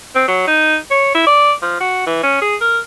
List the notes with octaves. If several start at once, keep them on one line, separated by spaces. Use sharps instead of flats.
C4
F#3
D#4
C#5
E4
D5
F3
F#4
E3
C#4
G#4
A#4